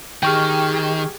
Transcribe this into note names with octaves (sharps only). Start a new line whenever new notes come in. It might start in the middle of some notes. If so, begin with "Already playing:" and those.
D#3 G4 G#4 G5 C#6 F6